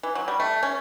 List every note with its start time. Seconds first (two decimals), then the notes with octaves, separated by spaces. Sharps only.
0.03 E3
0.15 F#3
0.28 G3
0.40 A3
0.63 C#4